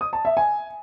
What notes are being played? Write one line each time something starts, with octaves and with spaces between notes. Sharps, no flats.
D#6
A5
E5
G#5